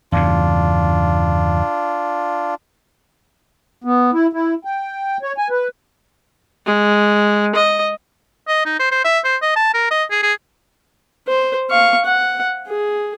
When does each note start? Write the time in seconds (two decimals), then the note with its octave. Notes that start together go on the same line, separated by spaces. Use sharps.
0.12 E2 G2 C#3 D4 F4
3.84 B3
4.13 E4
4.33 E4
4.65 G5
5.23 C#5
5.38 G#5
5.50 B4
6.66 G#3
7.55 D#5
8.48 D#5
8.65 D#4
8.79 C5
8.91 C5
9.05 E5
9.25 C5
9.42 D#5
9.56 A5
9.74 A#4
9.91 D#5
10.11 G#4
10.23 G#4
11.28 C5
11.70 F5 C#6
12.06 F#5
12.68 G#4